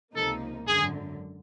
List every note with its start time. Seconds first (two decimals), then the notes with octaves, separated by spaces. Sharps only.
0.14 C#2 C3 F3 A#3 D#4 A4
0.67 G#1 F#2 D3 G#4